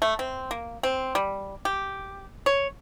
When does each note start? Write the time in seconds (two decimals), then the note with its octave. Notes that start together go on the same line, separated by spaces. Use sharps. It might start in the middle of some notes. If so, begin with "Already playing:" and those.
0.02 A3
0.19 C4
0.51 A#3
0.83 C4
1.15 G3
1.65 G4
2.46 C#5